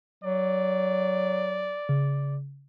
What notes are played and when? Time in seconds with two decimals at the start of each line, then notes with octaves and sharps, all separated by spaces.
0.24 F#3 D5
1.89 C#3